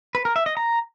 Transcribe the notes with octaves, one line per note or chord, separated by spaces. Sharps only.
B4
A#4
E5
D#5
A#5